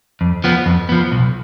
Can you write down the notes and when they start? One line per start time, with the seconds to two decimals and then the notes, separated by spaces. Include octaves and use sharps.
0.21 F2
0.44 F3 B3
0.66 F2
0.89 F3 B3
1.12 B1